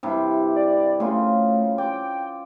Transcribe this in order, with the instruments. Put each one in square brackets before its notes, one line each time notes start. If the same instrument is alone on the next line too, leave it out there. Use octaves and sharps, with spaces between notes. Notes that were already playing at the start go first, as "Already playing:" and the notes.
[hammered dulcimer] G2 C3 E4
[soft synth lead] D5
[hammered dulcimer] C#3 F4 [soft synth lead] A3
[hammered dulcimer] D5 [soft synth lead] G5